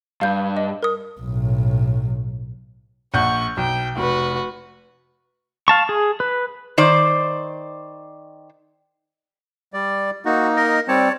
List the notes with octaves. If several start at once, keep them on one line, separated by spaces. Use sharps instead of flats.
G2 F5 G6
D#5
A#4 D#6
B1 A2
A#1 F#5 C#6 G6
B1 G5
F1 F#4 B4
F5 A5 C#6
G#4
B4
D#3 C5 D5
G3 D5
A#3 D#4 F#4
A#4 D#5
G3 C4 C#5 D5 A5